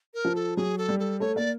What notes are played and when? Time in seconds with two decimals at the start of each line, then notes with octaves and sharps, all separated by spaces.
0.14 A#4
0.25 F3
0.35 A4
0.56 F#3 G#4
0.78 A4
0.88 G3
0.99 A4
1.20 A3 C#5
1.36 A#3 D5